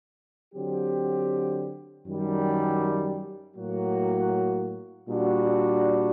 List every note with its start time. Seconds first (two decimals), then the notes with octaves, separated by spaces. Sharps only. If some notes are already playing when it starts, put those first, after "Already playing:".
0.54 D3 F#3 C4 G4
2.06 F#2 D#3 G3
3.57 A2 F#3 A#3 F#4
5.08 A#2 G3 D4 F#4